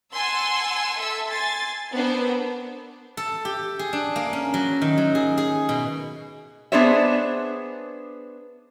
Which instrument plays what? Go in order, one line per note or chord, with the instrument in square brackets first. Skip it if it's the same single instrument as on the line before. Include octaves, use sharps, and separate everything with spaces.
[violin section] F#5 G#5 A5 C6 E6
A4 E5 E6
G#5 C6 A6
B3 C4 D4 A#4 C5
[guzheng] A4
G4
G#4
D4
A#3
C#4
F#3
D#3
F#3
G#4
G#4
B2
[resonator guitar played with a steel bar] B3 D4 G#4 C5 C#5 E5